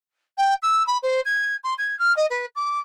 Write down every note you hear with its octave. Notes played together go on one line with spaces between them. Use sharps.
G5
E6
B5
C5
G#6
C6
G#6
F6
D#5
B4
D6